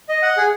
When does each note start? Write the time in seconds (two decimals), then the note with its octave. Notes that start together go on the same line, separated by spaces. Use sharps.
0.09 D#5
0.22 F#5
0.37 G#4